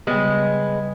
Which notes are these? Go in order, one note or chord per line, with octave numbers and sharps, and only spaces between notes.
C#3 G3 G#3 B3